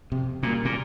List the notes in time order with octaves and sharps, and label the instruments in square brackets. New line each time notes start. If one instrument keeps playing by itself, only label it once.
[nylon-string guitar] F2 [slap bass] C3
[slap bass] A#2 [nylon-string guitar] C#3 G3 A#3
[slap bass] A#2